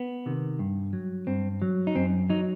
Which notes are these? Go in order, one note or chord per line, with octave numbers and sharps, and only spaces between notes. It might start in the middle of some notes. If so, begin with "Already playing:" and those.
Already playing: B3
C3 D#3
G2
F#3
G2 C4
F#3
D#4
F#2 C4
F#3 D#4